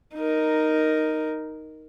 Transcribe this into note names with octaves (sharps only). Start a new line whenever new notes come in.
D#4 A#4